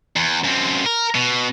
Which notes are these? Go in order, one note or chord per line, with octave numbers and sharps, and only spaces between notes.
E2
F#2 C4
A#4
B2